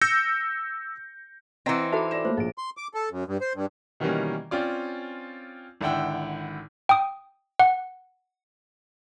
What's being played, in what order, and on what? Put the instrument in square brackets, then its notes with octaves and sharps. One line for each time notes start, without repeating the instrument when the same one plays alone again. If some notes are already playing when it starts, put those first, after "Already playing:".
[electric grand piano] E6 G6 A#6 C#7
[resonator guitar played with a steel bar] E3 C4 [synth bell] C5 A#5 A#6 [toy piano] D#5 F#5
[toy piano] D#4 F#4 A4 [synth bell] E5 B5 D6
[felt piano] D5 A#6 E7
[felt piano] A3 A#3 [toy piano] C5 C#5
[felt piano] A#1 [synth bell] G#4 D7
[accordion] C6
D6
A4
F#2
G2
C5
G2
[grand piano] B2 D#3 E3 G3 A#3 C#4
C4 C#4 F4 D5
G#1 D3 E4 F#5 G5 E6
[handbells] G5 D#6
F#5